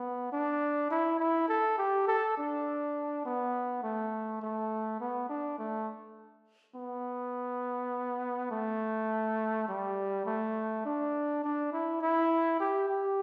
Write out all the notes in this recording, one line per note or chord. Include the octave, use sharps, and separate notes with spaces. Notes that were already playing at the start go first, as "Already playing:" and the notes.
Already playing: B3
D4
E4
E4
A4
G4
A4
D4
B3
A3
A3
B3
D4
A3
B3
A3
G3
A3
D4
D4
E4
E4
G4
G4